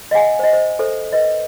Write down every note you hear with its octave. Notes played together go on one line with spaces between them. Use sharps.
D#5 F5 F#5 G#5
C5 D#5
C5
A4 C5 E5
B4 D#5